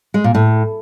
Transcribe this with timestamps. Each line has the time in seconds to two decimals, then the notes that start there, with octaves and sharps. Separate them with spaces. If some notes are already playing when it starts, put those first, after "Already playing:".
0.14 G#3
0.24 A#2
0.35 A2